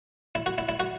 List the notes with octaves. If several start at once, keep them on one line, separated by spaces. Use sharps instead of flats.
E4
F#4
E4
E4
F#4